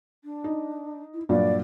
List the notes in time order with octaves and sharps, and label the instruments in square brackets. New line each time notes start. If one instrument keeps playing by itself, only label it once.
[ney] D4
[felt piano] D#4
[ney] E4
[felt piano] G2 A#2 F#3 [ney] D5